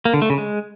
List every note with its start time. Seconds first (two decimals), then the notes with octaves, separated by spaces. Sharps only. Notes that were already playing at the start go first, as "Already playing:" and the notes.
0.05 A#3
0.14 D3
0.22 A3
0.30 C#3
0.38 G#3